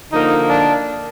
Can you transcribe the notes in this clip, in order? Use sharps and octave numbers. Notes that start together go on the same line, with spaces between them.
D3 F3 A#3 D#4
D4